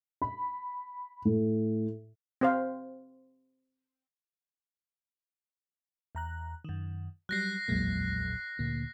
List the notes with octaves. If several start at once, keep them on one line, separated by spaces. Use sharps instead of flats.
B5
A2
C4 C5 F5
E2 A#5 F#6
F#2 D#3
F#3 G3 F#6 A#6 C7
D1 A#1 E2 F#3 G#3 A#3
D2 A#2 A#3